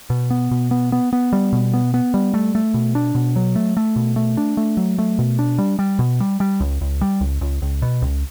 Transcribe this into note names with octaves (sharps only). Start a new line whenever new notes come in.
B2
B3
B2
B3
B3
B3
G3
B2
B3
B3
G3
A3
A3
B2
D4
B2
F#3
A3
A3
B2
A3
D4
A3
F#3
A3
B2
D4
G3
G3
B2
G3
G3
C#2
C#2
G3
C#2
C#2
C#2
B2
C#2